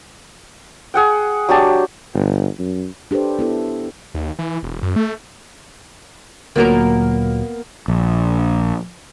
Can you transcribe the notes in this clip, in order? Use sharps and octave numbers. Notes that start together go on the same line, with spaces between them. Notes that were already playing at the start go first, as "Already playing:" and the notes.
G#4 F#5 G5
F#3 D4 G4 A5
G1
F#2
D4 G4 A4 B4 C5
B3 E4 A4
D#2
E3
E1
F#2
A3
D2 A#2 F#3 A#3 B3 A#4
A#1